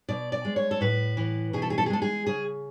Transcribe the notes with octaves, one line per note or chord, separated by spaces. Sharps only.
B2 D5
D5
G#3
C#5
A4
A2 B4
E3
B2 G#4
A4
G#4
A4
G#4
G#3 A4
G#4
C#3 G#4